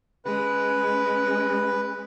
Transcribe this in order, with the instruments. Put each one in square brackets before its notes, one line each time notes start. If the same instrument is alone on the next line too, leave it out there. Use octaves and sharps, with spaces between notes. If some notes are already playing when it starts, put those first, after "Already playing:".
[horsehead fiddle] G#3 C#4 [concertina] B4